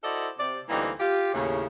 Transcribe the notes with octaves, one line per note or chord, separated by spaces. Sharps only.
E4 F#4 A4 C5 D5 D#5
C3 D5
D2 E3 G3 A#3 C4 D#4
F4 G4
D#2 A2 C#3